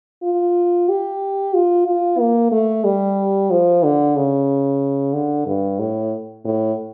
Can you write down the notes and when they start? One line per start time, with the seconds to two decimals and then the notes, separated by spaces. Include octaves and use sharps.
0.23 F4
0.89 G4
1.54 F4
1.86 F4
2.19 A#3
2.52 A3
2.84 G3
3.51 F3
3.84 D3
4.16 C#3
5.13 D3
5.46 G2
5.79 A2
6.45 A2